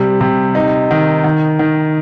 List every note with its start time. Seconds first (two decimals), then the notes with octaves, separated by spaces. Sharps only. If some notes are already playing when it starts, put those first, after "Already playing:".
Already playing: C3 G3
0.21 C3
0.55 D#4
0.91 D#3
1.24 D#3
1.59 D#3